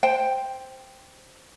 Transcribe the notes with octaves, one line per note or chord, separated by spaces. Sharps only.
C5 G5